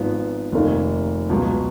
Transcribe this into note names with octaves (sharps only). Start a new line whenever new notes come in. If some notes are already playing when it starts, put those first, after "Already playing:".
Already playing: G#1 G#2 F3 B3
F1 D#2 D#3 A#3 D#4
C#2 B2 F#3